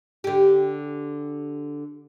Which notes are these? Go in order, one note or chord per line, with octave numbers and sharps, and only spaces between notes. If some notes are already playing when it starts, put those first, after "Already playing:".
D3 G4